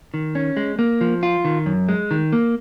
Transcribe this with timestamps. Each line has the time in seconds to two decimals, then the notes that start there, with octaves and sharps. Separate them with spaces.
0.14 D#3
0.35 C#4
0.57 G#3
0.79 A#3
1.01 F3
1.23 F4
1.45 D#3
1.66 F#2
1.89 G#3
2.11 D#3
2.33 A#3